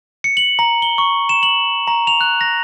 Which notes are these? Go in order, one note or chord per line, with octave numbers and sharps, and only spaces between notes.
C#7
F#7
A#5
G7
C#6
E7
F#7
A#5
F7
F#6
A#6